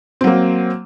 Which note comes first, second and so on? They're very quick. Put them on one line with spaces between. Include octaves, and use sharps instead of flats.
C4 F#3 A#3